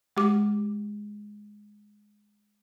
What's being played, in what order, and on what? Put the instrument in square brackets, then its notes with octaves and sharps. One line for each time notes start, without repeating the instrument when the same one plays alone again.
[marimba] G#3 G4 D6